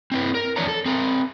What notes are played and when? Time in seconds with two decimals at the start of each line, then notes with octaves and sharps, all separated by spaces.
0.12 C4 E4 B4
0.35 A#4
0.56 F2 B2 E3 D4 C#5 A#5
0.68 A4
0.86 C4 A#4 G5